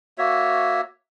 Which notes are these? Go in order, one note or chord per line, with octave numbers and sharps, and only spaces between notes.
A#3 F#4 C#5 E5